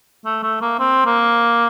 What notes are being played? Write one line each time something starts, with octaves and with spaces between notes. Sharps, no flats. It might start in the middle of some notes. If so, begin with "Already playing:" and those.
A3
A3
A#3
C4
A#3